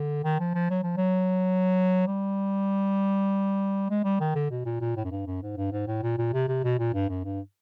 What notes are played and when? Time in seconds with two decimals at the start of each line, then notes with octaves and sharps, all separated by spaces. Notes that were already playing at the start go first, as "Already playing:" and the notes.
Already playing: D3
0.24 D#3
0.40 F3
0.55 F3
0.70 F#3
0.83 F3
0.97 F#3
2.07 G3
3.90 G#3
4.04 G3
4.20 D#3
4.35 D3
4.50 B2
4.65 A#2
4.81 A#2
4.96 A2
5.04 F#2
5.11 G2
5.26 F#2
5.42 G#2
5.57 G2
5.72 G#2
5.87 A2
6.02 A#2
6.18 A#2
6.33 C3
6.48 C3
6.64 B2
6.79 A#2
6.94 G2
7.09 F#2
7.24 G2